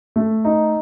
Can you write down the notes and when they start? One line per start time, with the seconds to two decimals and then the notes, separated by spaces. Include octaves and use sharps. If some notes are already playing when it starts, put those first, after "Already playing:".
0.16 A3
0.45 D#4